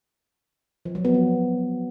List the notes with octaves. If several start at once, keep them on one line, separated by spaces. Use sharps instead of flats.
F3
F#3
B3
F3